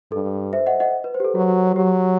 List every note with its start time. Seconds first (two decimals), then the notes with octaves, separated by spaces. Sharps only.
0.12 G2 A4
0.53 C5 E5
0.66 D#5 F#5
0.80 D#5 F#5
1.04 B4
1.14 C5
1.20 G4
1.24 A4
1.35 F#3 F#4
1.75 F#3 G4